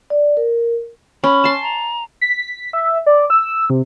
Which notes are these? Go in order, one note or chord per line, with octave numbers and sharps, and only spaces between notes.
D5
A#4
C#4 B5
A5 C6
A#5
B6
E5
D5
E6
C3